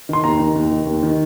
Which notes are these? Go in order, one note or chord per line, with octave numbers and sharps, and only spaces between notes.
D#3 C6
D#2 A#5
D#3
D#2
D#3
D#2
D#3